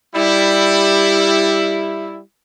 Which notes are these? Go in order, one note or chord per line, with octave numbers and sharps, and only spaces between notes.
G3 E4